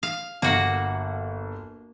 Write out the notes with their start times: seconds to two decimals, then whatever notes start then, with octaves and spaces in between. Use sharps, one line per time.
0.03 F5
0.42 G1 A#3 F#4